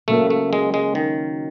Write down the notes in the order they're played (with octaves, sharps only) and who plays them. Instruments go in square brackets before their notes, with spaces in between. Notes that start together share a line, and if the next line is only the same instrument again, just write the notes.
[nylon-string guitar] C#3 F#3 A#3 C#4 F#4 [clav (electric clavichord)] A3
[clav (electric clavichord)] A3
G#3
G#3
D#3